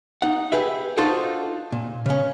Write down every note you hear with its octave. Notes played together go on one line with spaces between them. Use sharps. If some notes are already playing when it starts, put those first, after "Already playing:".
D#4 F#5
G4 G#4 B4 E5
D4 D#4 F4 F#4 A4 C5
A#2
C#3 C#4